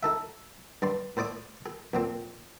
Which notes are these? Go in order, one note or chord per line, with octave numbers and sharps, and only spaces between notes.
D#4 A4 E5
G2 D5 C6
A2 C5 D5 D6 D#6
G#4
F2 A#2 C4